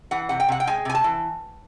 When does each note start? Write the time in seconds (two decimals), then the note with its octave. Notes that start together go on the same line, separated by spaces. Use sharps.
0.11 E3 F#5
0.29 C3 F#5
0.40 G5
0.49 C3 F#5
0.60 G5
0.67 G#3 G#5
0.85 C3 G#5
0.95 A5
1.04 E3